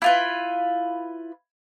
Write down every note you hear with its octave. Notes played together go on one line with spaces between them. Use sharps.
E4 F4 B4